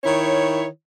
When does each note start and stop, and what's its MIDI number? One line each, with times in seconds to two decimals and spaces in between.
0.04 0.65 51
0.04 0.65 64
0.04 0.65 73